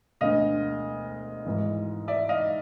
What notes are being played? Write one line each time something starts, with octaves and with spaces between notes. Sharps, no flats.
E1 D2 D3 D#5 F5
G#1 G#2 E3
D5 E5
D#5 F5